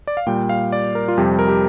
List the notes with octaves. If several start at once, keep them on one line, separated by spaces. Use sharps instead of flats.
D5
F5
A#2 G3 G5
F5
D5
A#4
F4
F2 C3 G3 G4
A#4
G4